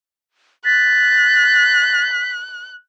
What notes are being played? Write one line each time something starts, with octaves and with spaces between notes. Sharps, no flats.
F#6 A6 B6